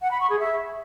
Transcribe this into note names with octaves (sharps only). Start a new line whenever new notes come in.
F#5
B5
C#6
G#4
E5